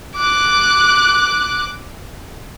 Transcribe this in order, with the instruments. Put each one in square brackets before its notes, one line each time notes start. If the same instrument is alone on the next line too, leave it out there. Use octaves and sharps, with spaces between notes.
[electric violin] D6 F#6